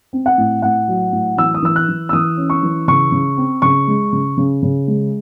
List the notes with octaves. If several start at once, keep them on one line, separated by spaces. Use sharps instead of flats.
C4
F#5
A2
A2 F#5
F#3
A2
E3 E6
D#6
E3 E6
F#6
E3
E6
E3 D#6
C#4
C#6
E3
C#3 C#6
C#3
C4
C#3 C#6
G#3
C#3
C#3
C#3
G#3